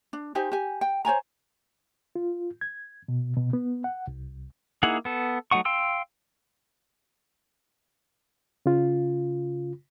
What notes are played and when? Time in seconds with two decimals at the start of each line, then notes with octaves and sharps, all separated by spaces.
0.13 D4
0.35 D#4 G4 C5 G#5
0.52 G4 G#5
0.81 G5
1.05 C5 C#5 G#5 A#5
2.15 F4
2.61 G#6
3.08 B2
3.37 B2
3.53 B3
3.84 F#5
4.08 C2
4.83 A#3 D#4 E4 G#4 F#5
5.05 B3 A4
5.51 F#3 A3 D#4 F#5 C#6
5.65 F5 G5 C6 E6
8.66 C#3 F4